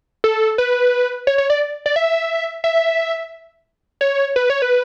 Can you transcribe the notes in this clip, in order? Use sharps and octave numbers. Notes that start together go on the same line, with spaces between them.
A4
B4
C#5
C#5
D5
D5
E5
E5
C#5
B4
C#5
B4